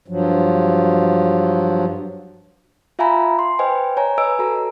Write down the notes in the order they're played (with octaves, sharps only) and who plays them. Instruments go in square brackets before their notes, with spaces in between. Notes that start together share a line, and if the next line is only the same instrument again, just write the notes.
[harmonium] G2 F3 F#3
[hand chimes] F4 E5 F5 G#5 A#5 B5
C6
B4 C5 D#5 G5 G#5
C#5 G#5 A#5
B4 D#5 G#5 E6 D7
F#4 A4 A#5